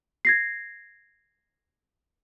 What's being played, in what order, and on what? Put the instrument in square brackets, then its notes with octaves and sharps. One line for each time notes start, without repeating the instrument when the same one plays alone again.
[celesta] G#6 A#6 C7